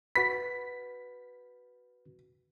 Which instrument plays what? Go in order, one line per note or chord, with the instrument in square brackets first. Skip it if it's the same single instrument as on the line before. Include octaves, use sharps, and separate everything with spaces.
[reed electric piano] F#4 B4 B5 [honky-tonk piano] B6